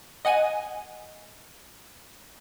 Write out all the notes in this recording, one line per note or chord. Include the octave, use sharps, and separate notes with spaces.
D#5 F#5 G#5 D#7